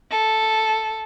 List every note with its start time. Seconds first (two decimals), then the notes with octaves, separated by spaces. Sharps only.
0.11 A4